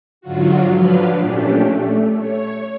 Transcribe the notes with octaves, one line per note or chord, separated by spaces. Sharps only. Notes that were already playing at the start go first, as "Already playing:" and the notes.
G#2 D3 F#3 F4 F#4
F3 F#3 D4 B4 F5
A#2 A3 C#4 D4 G4
A3
C#5